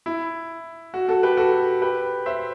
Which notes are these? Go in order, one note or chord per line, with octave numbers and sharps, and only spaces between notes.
E4
F#4
F#4 A4
G4 B4
F#4 A4
G4 B4
C5 E5